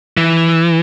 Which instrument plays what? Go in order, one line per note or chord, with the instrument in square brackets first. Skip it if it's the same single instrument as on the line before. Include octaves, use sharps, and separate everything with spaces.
[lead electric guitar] E3